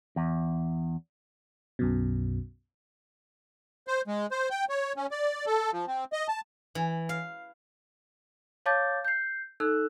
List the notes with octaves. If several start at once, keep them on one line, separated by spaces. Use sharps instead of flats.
E2
B1 F#2 B2
C5
G#3
C5
G5
C#5
C#4
D5
A4
F3
C4
D#5
A5
E3
F5
C#5 F5 A5 D6 G6 A6
G6 C7
D#4 A4 E6 F#6